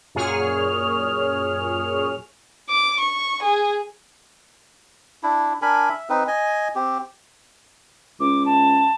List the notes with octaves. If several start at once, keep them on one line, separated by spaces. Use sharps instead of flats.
F#2 A#2 G#4 C#5 F6
D6
C#6
G#4
D4 E4
D4 A#4 G#5 B5
E5
C4 D#4 B4
D#5 G#5
C4 G4
C#2 D6
A5